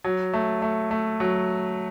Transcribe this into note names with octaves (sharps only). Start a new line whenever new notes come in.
F#3
A3
A3
A3
F#3